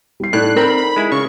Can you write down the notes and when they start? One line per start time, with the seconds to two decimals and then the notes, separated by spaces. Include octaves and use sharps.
0.20 G3 C7
0.33 A2 D#4 A4 D5 F#6
0.57 C4 A#4 B5
0.78 B5
0.96 G#3 E4
1.12 C#3 C#6